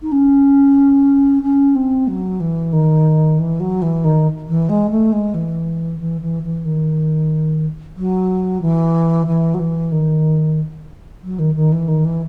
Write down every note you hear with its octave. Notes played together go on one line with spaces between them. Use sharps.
D#4
C#4
C#4
C4
F#3
E3
D#3
E3
F#3
E3
D#3
E3
G#3
A3
G#3
E3
E3
E3
E3
D#3
F#3
E3
E3
F#3
E3
D#3
F#3
D#3
D#3
E3
D#3
E3